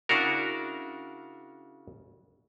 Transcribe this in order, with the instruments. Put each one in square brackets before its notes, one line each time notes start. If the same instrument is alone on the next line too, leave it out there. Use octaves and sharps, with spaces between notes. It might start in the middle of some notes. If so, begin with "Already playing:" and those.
[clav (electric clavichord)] C#3 D4 E4 F#4 A#4